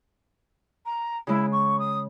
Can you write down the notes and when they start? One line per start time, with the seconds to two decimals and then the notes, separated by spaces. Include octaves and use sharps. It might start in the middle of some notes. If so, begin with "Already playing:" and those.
0.85 A#5
1.27 C#3 G#3 E4
1.52 C#6
1.79 D#6